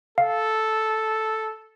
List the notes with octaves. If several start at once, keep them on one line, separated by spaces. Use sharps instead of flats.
A4 F5